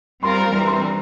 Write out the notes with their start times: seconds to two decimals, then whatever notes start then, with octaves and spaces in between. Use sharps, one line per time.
0.23 G3 C4 F4 A#4 C6
0.38 A#5
0.52 E3 G3 C4 A#5
0.67 C6
0.82 A#5